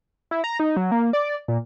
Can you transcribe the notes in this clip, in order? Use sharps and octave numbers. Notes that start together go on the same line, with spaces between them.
E4
A#5
D#4
F#3
A#3
D5
A#2